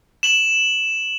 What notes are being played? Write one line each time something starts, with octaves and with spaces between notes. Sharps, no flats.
E7 F#7